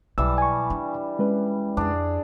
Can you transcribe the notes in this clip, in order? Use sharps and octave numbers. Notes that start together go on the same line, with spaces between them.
B1 E3 G3 A5 E6
G#5 C#6
D4
G#3 C#4 B4
F2 D4 G#4